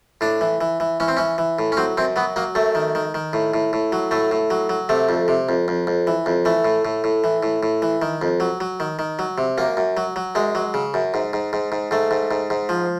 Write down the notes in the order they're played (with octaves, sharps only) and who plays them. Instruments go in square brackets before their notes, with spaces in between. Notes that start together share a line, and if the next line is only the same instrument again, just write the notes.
[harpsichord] A2 D4
E3
E3
E3
E3 C#4
C4
E3 C#4
E3
A2
C#4
F#3 C4
F#2 C4
F#3 B3
F#3 A#3
F#2 A3
D#3
D#3
D#3
A2
A2
A2
F#3
A2 A3
A2
F#3
F#3
C3 A3
F2
C3
F2
F2
F2
E3
F2
E3 A3
A2
A2
A2
E3
A2
A2
E3
D#3
F2
F#3
F#3
D#3
D#3
F#3
C3
F#2 A#3
F#2
F#3
F#3
F#2 G#3
F#3
C#3
F#2
G#2
G#2
G#2
G#2
G#2 A3
G#2
G#2
G#2
F3